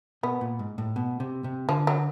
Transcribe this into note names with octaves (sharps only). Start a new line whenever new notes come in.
B2 B3
A#2
G#2
A2
B2
C3
C3
D3 F3
F#3